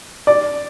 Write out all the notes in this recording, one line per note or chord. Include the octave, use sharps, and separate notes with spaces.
D5